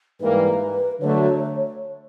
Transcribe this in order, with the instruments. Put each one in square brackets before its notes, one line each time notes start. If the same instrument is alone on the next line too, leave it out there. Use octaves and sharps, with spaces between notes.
[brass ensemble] G#2 E3 G3 A#3 [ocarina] B4
[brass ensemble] D3 F#3 A3 [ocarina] C#5